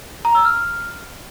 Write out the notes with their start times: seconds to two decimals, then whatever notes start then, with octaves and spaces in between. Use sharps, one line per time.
0.25 A#5
0.35 E6
0.45 F6